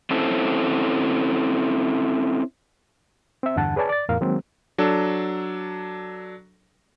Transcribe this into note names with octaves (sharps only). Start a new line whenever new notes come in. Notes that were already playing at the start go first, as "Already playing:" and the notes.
C4 C#4 E4 A4 C5
C4 E5
E2 G2 D3 F#5 A5
G#4 B4 C#5 D5 G#5 A5
D5 A6
E2 A2 A#4 F5
D#3 F#3 G#3 A#3 C4
F#3 D4 A4